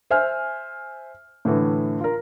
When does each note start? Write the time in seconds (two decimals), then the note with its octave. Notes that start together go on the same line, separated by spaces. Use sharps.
0.11 C5 E5 G#5 F6
1.45 A2 D3 E3 A3
2.01 F4 A#4